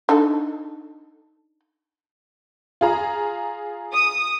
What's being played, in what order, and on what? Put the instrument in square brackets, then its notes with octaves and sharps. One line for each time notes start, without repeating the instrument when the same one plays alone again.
[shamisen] D4 D#4 A4
[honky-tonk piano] F4 G#4 A#5
[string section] D#6